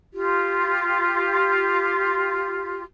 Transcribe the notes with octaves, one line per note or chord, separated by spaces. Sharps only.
F4 G4